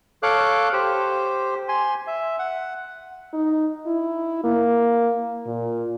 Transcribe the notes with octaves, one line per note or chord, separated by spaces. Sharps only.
A4 C#5 F5 D6 F#6
G4 C5
G#5 C6
E5
F#5
D#4
E4
A#3
A#2